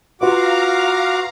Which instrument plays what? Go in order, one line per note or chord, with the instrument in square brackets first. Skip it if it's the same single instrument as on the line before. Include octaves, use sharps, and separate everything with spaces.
[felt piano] F4 B4 [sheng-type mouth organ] F#4 D6 [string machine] F5 A#5